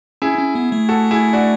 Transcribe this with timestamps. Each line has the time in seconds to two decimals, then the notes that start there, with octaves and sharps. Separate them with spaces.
0.22 C#4 E4 G#4
0.39 C#4
0.55 B3
0.72 A3
0.89 F#4 A4
1.11 E4 G#4
1.33 D4 F#4